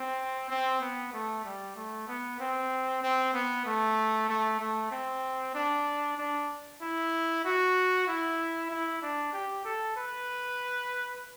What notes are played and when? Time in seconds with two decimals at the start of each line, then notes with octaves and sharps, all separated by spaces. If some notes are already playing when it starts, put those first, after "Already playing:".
Already playing: C4
0.50 C4
0.81 B3
1.13 A3
1.45 G3
1.76 A3
2.08 B3
2.40 C4
3.02 C4
3.34 B3
3.66 A3
4.29 A3
4.60 A3
4.91 C4
5.54 D4
6.18 D4
6.81 E4
7.45 F#4
8.07 E4
8.71 E4
9.02 D4
9.33 G4
9.65 A4
9.96 B4